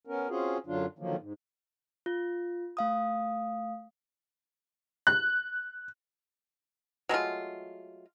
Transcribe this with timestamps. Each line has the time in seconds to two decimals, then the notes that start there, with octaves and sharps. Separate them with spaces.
0.07 B3 C#4 A#4
0.29 C4 C#4 F4 F#4 G#4
0.66 F#2 D3 F#3 D4 F4
0.99 D3 D#3 F3 F#3 A#3
1.19 G#2
2.06 F4
2.77 A3 F5 D#6
5.07 F#6
7.09 F#3 G#3 A3 F4